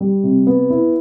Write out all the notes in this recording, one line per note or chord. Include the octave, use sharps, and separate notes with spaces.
G3
C3
B3
E4